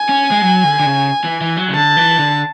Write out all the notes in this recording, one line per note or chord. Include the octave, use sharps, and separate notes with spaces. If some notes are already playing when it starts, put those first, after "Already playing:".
Already playing: G#5
C#4
G#3
F#3
D3
D3
C#3
E3
E3
F#3
C#3
D3 A5
E3
D3